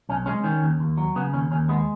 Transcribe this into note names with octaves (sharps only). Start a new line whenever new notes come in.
B1 C#4
G#3 C#4
D#3 C#4
D#2
D#2
F#3
C#3 B3
D#2 C#4
D#2 C#4
G#3 B3